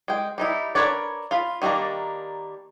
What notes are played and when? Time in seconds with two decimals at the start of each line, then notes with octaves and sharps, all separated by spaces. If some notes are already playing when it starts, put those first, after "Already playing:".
0.08 G#3 G5
0.38 G3 D#4 E4
0.75 D4 A#4 B4 C#5 D5
1.31 F4 F5 B5
1.62 D#3 G3 A#3 D4 A#5